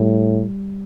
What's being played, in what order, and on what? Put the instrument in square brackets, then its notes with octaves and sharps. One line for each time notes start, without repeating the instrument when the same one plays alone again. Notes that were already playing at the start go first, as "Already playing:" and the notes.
Already playing: [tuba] A2 [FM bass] G3